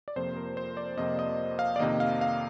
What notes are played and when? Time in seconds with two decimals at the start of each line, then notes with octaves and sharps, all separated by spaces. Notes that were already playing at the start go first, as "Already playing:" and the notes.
0.08 D5
0.16 F2 C3 F3 A#3 C5
0.37 A#4
0.57 C5
0.77 D5
0.97 F2 C3 F3 A#3 D#5
1.19 D#5
1.59 F5
1.76 D5
1.79 F2 C3 D#3 A#3 D#5
2.00 F5
2.21 F5